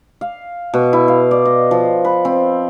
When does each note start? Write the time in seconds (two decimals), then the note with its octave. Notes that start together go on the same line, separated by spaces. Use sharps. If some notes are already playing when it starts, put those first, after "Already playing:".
0.21 F5
0.74 B2
0.93 E4
1.08 F5
1.31 D5
1.45 D#5
1.71 F3
2.05 B4
2.25 C4